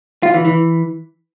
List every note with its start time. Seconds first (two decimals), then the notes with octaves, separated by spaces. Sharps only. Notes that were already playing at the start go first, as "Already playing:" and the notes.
0.23 F4
0.34 E3
0.45 E3